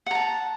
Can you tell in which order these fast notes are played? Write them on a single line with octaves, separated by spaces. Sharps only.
F#5 A#5 A5